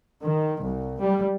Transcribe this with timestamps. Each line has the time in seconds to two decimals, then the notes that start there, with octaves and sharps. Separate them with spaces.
0.23 D#3
0.62 C2
1.01 G3